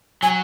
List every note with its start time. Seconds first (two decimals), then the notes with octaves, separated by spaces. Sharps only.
0.23 F#3 G#5